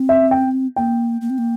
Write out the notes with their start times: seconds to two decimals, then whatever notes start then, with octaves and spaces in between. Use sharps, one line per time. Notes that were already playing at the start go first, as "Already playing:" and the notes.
Already playing: C4
0.09 E5
0.31 G5
0.76 A#3 G5
1.21 A#3
1.30 C4
1.38 A#3